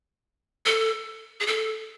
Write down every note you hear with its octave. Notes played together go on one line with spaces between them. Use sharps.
A4
G#4
A4